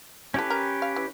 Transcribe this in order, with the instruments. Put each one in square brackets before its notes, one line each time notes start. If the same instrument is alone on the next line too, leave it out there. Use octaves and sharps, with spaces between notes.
[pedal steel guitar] C#4 G4 B4 [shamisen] E4 A4
[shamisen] A#4
F5
E3